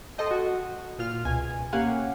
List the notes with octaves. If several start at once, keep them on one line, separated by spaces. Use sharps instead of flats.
A4 C5 D#5 G5
F#4
A#2 F4 F6
C#2 B2 G#5
A#3 C#4 G4 F5 F#5 G#5